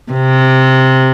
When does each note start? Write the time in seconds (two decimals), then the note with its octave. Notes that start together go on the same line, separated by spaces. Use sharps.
0.13 C3